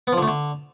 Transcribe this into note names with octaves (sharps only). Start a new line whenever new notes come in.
B3
F3
D3
A3
D3